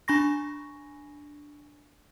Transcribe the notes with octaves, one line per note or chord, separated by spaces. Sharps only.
D4 G#5 B5 C#6 A#6